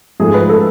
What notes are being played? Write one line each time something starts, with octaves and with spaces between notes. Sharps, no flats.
G#2 F3 A3 G#4
B4
A4